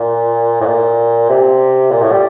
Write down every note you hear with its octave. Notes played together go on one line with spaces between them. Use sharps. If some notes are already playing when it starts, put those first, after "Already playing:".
Already playing: A#2
A2
A#2
C3
A#2
A2
G3